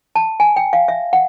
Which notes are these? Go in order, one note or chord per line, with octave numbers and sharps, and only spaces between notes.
A5
G#5
G5
F5
E5
F#5